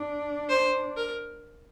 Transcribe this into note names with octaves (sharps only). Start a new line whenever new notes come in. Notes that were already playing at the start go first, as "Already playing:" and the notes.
Already playing: D4
C5
A#4